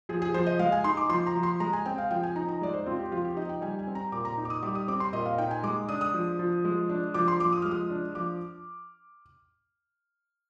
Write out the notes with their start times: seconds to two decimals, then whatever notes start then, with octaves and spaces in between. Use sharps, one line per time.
0.09 F3 G#4
0.22 G#4
0.34 F3 C5
0.46 D#5
0.59 G#3 F5
0.72 G#5
0.84 D#4 C6
0.97 D6
1.09 F3 C6
1.27 A#5
1.35 F3
1.43 C6
1.60 G#3 A#5
1.73 G#5
1.86 C4 G5
1.98 F5
2.11 F3 G5
2.23 G#5
2.36 D#4 A#5
2.48 A#5
2.61 G#3 D5
2.74 C5
2.86 C4 F4
2.99 G4
3.11 F3 F4
3.25 G4
3.36 D#4 D#5
3.49 G5
3.62 G3 G#5
3.79 G#5
3.87 C4
3.95 A#5
4.12 A#2 D6
4.25 A#5
4.37 D#4
4.45 D6
4.50 D#6
4.62 G3 D6
4.75 D#6
4.88 C4 D6
5.00 C6
5.13 A#2 D#5
5.25 F5
5.38 D#4 G5
5.51 G#5
5.63 G#3 D6
5.89 D4 D#6
6.01 D#6
6.14 F3
6.39 F3
6.65 G#3
6.89 D4
7.14 F3 D6
7.28 C6
7.40 F3 D6
7.52 D#6
7.62 G#3 F6
7.71 D#6
7.90 D4
8.15 F3 D6